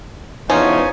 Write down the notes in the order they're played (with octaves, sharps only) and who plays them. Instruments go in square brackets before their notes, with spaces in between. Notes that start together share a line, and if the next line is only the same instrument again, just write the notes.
[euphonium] E2 [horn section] F3 B3 D#4 [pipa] C#4 [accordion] F4 C5 G#5